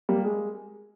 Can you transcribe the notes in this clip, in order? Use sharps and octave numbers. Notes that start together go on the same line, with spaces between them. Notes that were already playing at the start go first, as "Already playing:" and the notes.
G3 A#3
G#3